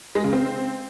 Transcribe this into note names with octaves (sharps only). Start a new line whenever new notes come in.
G#3
C#3
C4